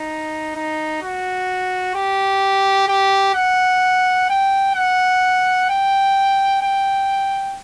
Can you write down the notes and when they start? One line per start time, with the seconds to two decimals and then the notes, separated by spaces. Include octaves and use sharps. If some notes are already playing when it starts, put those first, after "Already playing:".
Already playing: D#4
0.55 D#4
1.02 F#4
1.95 G4
2.88 G4
3.35 F#5
4.29 G5
4.75 F#5
5.69 G5
6.62 G5